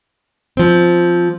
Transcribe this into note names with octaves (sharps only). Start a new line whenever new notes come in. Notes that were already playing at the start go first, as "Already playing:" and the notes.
F3 C4